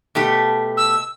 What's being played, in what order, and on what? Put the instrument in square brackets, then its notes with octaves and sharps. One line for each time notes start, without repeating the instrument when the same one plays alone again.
[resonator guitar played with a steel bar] B2 A3 G4
[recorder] E6